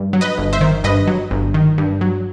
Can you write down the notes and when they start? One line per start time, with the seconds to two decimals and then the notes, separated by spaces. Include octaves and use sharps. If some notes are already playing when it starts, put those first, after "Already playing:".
Already playing: G2
0.13 F#3
0.21 B4 D#5
0.38 G1
0.53 C5 E5
0.61 D#3
0.84 G2 B4 D#5
1.07 F#3
1.31 G1
1.54 D#3
1.78 G2
2.01 F#3